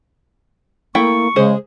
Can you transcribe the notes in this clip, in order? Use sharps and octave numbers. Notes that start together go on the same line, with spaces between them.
A3 A#3 E4 G5 C#6
C#3 G#3 G#4 C5